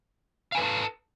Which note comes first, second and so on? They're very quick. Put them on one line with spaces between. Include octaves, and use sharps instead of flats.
F5 G#5 B4 A4 A5